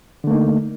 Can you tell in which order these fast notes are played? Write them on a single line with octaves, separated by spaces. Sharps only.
D3 A3 A#3 D#4